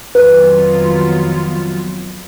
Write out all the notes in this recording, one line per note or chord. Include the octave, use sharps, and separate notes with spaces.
F2 D#3 F#3 B3 F4 B4